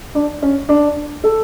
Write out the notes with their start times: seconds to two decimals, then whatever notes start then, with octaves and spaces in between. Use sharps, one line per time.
0.15 D4
0.42 C#4
0.69 D4
1.24 A4